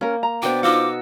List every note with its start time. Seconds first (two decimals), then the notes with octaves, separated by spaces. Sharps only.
0.01 A#3 C#4 A#4
0.23 A#5
0.43 B2 D4 C5 G5 D6
0.63 D#4 F4 F#4 D#5 D6 E6 C#7